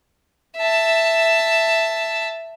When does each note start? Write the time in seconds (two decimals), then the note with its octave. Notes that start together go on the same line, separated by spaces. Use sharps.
0.58 E5 A5